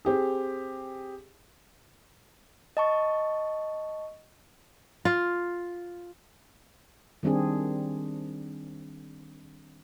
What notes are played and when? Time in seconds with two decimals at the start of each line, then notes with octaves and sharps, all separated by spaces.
0.05 C4 G4 G#4
2.77 D#5 A5 C#6
5.05 F4
7.23 D#3 G3 C4 D4 G#4